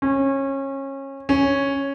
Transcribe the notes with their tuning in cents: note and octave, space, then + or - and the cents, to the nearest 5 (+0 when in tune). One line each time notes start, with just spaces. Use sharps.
C#4 -25
C#4 -5